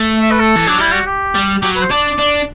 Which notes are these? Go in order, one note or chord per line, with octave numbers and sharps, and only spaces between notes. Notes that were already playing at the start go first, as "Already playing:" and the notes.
Already playing: A3
E5
B4
A4
E3
F#3 D4
G3 E4
F#4
G4
G3
F#3 G4
B4
C5
D4 D5
D4